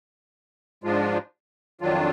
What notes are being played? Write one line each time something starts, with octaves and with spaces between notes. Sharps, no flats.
G#2 F3 G#3 D4 F4
F2 D#3 F#3 D4 F4